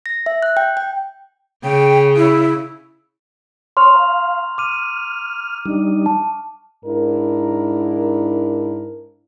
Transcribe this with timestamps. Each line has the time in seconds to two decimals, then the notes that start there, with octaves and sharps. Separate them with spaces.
0.06 A#6
0.26 E5
0.42 F#6
0.57 G5
0.77 G5
1.64 C#3 G5
2.16 E4
3.77 C#5 C6 C#6 F6 F7
3.94 F5 A#5
4.58 D6 F6 D#7
5.66 G3 D4 D#4
6.06 A5
6.85 G#2 D4 E4 A#4